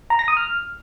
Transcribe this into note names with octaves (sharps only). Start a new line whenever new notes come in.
A#5
A#6
D#6
F6